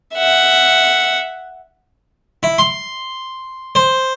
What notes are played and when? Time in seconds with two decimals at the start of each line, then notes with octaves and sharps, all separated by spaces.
0.14 E5 F#5
2.43 E4
2.58 C6
3.75 C5